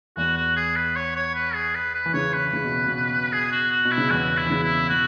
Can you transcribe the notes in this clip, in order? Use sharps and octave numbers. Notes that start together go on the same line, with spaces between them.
E2 E3 F#4
F#4
G#4
B4
C#5
C#5
B4
G#4
B4
B4
E3
C#3 C#5
B4
C#3
B2
B2
G#4
F#4
F#4
B2
E4
C#3
E2 E3 F#4
E4
E3
C#3
E4
B2 F#4